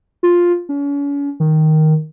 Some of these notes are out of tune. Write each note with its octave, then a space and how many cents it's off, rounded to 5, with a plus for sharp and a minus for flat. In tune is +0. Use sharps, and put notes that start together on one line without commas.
F4 +5
C#4 +40
D#3 +5